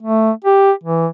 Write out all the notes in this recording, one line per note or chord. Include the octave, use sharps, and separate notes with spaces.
A3
G4
E3